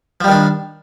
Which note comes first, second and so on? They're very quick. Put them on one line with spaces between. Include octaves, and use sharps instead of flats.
F3 G3 D#3 D4